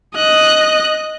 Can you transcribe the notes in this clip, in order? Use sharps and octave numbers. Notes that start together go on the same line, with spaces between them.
D#5 F#6